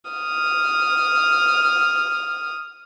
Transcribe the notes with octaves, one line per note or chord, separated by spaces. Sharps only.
D#6 F6